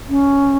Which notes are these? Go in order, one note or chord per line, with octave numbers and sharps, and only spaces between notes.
C#4